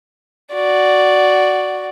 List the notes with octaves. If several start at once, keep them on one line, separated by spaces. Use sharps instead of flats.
F#4 D5